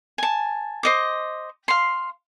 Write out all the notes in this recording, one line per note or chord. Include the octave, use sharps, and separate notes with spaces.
G#5 A5
C5 D#5 D6
F5 C6